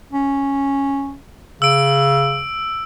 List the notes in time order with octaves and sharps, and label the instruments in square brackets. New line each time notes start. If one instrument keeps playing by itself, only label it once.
[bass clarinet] C#4
[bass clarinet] C#3 [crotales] E6 D7